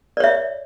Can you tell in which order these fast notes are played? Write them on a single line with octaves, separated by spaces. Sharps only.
D5 C#5 E5